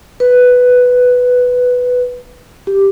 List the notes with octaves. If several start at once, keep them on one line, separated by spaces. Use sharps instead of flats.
B4
G4